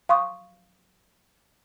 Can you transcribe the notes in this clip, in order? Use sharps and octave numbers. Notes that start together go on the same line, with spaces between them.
F5 C6 C#6 D#6